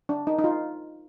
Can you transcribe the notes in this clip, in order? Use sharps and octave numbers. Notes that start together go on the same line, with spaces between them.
D4
D#4
D#4
F4